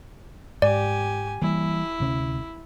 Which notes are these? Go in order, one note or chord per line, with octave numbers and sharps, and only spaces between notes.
G#2 G4 D5 G#5
E3 G3 A#3 E4
D2 C3 C#4